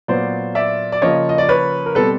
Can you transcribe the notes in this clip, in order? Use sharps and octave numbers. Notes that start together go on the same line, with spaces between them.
A#2 F#3 B3 C5 D5
D5 E5
D5
C#3 F3 A#3 C#5 D#5
D#5
D5
B4 C#5
A#4
B2 G3 C4 A4 B4